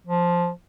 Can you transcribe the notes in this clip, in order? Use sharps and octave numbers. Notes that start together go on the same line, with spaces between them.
F3